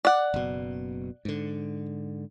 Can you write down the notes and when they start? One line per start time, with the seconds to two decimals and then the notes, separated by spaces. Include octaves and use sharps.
0.05 D5 F#5
0.34 F#1 B2
1.25 G#2 D3